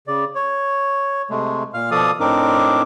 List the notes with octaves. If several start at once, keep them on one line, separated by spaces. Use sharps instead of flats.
C#3 D5
C#5
C3 G#3 A3
A#2 F5 F6
B2 F3 A4 D5 F5 D#6
A2 C4 D4 D#4 A#4 D6